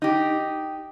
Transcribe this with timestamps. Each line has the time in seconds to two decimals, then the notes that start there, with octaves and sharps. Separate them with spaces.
0.02 D#4 G4